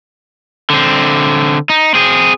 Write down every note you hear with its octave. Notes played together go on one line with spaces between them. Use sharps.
D3 C4
D#4
C4 G#4